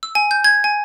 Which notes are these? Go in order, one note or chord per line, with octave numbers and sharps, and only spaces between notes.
E6
G#5
G6
G#6
G#5